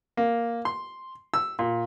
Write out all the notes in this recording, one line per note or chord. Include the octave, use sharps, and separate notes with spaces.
A#3
C6
E6
A#2